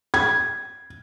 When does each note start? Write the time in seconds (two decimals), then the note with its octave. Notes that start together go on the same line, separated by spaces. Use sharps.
0.14 G#6